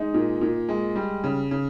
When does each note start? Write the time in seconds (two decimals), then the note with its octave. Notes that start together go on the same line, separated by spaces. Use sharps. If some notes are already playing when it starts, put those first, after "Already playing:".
Already playing: G#3 D#4
0.14 A#2
0.41 A#2
0.69 G#3
0.96 G3
1.24 C#3
1.51 C#3